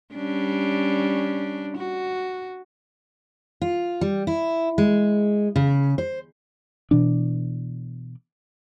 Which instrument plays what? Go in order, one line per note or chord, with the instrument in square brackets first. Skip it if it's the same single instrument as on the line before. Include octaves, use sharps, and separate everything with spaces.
[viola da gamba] G3 C#4 D4
F#4
[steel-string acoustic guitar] F4
G3
E4
G#3
C#3
C5
[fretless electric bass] B2 E3 D4